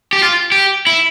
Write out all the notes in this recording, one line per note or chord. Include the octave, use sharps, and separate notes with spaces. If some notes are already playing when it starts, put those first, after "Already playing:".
G4
F4
G4
E4